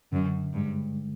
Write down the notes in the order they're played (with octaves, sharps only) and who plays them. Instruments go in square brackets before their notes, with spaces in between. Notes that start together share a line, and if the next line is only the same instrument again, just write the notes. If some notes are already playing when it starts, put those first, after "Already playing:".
[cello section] F#2 [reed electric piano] D3
[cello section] G2 [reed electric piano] G#3